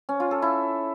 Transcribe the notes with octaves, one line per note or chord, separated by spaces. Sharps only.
C#4
F4
A4
E4